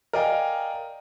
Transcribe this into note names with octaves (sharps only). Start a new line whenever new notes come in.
A#4 D5 D#5 F5 G5 G#5